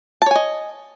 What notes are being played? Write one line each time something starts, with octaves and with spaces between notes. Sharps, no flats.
C#5 D#5 G#5 A5